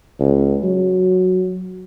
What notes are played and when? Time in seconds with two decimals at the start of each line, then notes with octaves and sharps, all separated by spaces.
0.20 C#2
0.63 F#3